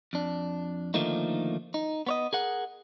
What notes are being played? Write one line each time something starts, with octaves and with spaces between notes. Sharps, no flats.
F2 D4
D3 D#3 F3 A3 A#3 D#4
D#4
B3 C#5 D#5
G#4 A#4 F#5